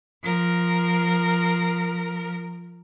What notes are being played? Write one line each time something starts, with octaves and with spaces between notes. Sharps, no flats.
F3 A#4